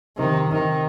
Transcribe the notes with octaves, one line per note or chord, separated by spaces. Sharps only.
C3 D#3
C3 D#3